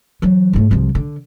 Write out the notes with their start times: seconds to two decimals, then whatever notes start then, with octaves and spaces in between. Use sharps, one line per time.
0.22 E3 F#3
0.53 G#2 A3
0.71 C2 F3
0.95 D3